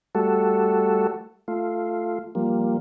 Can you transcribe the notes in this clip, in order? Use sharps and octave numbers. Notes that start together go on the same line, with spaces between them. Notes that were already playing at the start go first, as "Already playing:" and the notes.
G3 A3 F#4 A4
A3 F4
F3 G3 A#3